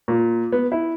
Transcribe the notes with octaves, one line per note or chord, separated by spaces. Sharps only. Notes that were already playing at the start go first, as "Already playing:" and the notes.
A#2
B3
E4